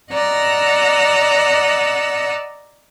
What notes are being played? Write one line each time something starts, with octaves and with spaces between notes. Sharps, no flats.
D5 D#5 F#5 A#5 E6 F#6